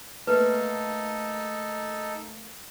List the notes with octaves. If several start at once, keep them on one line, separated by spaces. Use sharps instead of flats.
A3 A#3 D#4 A4 B4